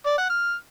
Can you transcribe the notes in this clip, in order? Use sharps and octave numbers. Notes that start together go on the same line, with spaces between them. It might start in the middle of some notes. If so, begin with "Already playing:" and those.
D5
F#5
F6